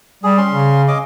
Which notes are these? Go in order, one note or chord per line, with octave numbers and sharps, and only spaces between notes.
G3 G#4
C#4 C6
C#3
C#4 D#5 D6